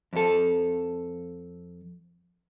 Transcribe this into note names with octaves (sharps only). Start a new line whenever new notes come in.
F2 A4